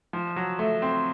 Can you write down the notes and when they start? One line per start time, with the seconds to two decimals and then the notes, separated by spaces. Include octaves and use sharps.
0.13 F3
0.36 F#3
0.59 A3
0.82 C4